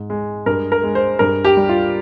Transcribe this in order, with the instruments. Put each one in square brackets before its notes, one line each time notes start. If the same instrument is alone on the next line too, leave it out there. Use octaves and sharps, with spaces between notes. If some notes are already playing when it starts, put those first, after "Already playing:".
Already playing: [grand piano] G#2
G#3
G2 A#4
A#4
G#3
C5
G2 A#4
G4
G3
F4